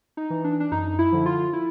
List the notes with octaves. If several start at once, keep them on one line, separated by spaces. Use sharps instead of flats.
D#4
E3
D4
D4
F#2 D#4
E4
D3 F3
F4
E4